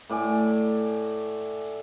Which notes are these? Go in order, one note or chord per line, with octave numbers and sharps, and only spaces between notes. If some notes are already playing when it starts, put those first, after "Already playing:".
A2 D5 G#5